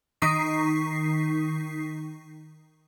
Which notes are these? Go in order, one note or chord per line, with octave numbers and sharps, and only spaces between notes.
D#3 D#4 C#6 B6 C7